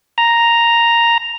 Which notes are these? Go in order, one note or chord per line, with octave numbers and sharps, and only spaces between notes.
A#5